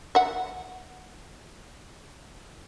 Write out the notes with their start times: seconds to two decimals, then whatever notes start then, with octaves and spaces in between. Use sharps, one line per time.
0.15 E5 F#5